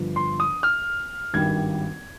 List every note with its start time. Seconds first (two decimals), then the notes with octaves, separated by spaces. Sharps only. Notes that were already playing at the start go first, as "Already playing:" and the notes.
Already playing: G1 G2 F3
0.16 C6
0.40 D#6
0.63 F6
1.34 G#1 G2 D#3 G3 G#6